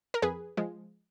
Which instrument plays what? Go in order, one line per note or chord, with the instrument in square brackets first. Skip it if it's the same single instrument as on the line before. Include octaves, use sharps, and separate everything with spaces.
[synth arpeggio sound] A#4
F2 G#4 B4
F3 G#3